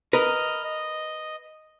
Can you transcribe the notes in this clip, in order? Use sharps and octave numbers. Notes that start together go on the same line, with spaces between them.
A#4 B4 D#5 F6
D#5